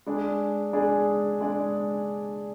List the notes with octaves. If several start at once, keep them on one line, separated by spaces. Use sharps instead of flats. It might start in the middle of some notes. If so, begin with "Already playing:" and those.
G#3 D4 G#4 D5
G#3 D4 G#4 D5
G#3 D4 G#4 D5